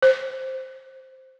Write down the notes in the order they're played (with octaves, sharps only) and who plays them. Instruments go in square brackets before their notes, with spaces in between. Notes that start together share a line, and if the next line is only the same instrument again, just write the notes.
[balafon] C5